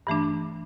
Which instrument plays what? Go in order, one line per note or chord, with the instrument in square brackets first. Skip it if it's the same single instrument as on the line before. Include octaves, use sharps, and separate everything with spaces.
[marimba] G2 E3 A3 D4